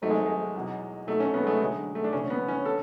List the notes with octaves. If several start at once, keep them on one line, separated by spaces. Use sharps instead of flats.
G#1 G#2 F#3 A3
G#3
G#3
E2 B2 F#3
B1 B2 F#3 A3
C#4
B3
G#3
A3
E1 D2 D3 F#3 G#3
A3
D4
E1 D2 C#3 C#4
B3
C#4
D3 A4